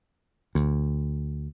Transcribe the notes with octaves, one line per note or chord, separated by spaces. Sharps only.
D2